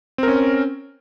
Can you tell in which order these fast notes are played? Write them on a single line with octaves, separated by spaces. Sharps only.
C4 A#4 C#4